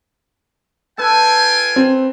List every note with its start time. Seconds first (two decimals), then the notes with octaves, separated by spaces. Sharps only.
0.98 F4 A4 B4 G5 G#5
1.76 C4